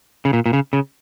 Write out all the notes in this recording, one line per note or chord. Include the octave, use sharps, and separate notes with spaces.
C#3
A#2
A#2
C#3
C#3